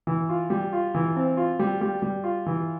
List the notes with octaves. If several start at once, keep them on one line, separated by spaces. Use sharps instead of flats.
E3
F4
G3
F4
E3
C4
F4
G3
G3
G3
F4
E3